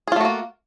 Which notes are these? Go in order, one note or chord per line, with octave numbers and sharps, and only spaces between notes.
A3 A#3 F4 F#4 G#4